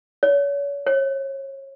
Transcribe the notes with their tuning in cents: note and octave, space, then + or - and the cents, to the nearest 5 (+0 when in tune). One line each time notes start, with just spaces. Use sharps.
C#5 +35
C#5 -30